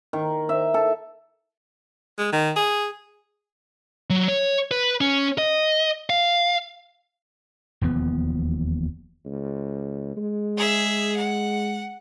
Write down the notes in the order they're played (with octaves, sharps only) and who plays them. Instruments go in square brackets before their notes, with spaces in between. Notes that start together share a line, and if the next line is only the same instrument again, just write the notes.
[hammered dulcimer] D#3
E5
A4
[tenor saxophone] G#3
D#3
G#4
[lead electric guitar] F#3
C#5
B4
C#4
D#5
F5
[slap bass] E1 D#2 F3 B3
[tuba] C#2
G#3
[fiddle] G#4 E5
F#5